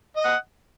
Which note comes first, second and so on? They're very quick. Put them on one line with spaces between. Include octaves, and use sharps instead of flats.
D#5 D#6 F#5